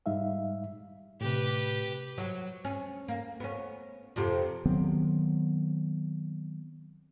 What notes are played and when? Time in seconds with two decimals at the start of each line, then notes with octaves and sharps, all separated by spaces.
0.06 G#2 G3 D#4 E5 F5
1.21 A2 C3 G4 B4
2.18 F#3
2.65 C#4
3.08 A#3
3.40 B3 C#4
4.16 F2 C3 G4
4.65 D#3 F#3 B3 C4